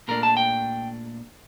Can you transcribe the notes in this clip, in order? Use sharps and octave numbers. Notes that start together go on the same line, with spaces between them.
A#2 A3 D4 A#4
A5
G5